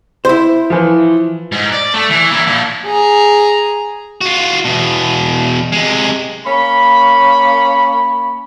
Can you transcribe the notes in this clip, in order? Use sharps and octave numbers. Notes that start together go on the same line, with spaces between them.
E4 C5
E3 F3
G#2
D5
A3
E3
A#3 E4
A#2 F3
G#4 A#5
F4 F#4
E2 B2
C3 G#3
A#3 C#4 B5